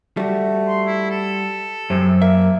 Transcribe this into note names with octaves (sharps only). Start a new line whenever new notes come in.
G3 A3 F#4
C6
E4
A4
F#2 C3
A#3 E5